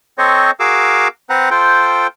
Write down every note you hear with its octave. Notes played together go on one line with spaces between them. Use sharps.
C4 A4 C5 C#5 D#5 C#6
F#4 G#4 A#4 F5 D6 E6
C4 B4 C5 F#5 A#5
F4 A4 C5 G5